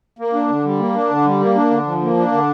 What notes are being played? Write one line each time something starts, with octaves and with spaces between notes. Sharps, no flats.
A#3
D4
D3
G3
A#3
D4
D3
G3
A#3
D4
D3
F3
A#3
D4
D3